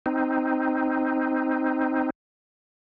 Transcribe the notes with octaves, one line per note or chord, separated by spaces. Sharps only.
C4 D#4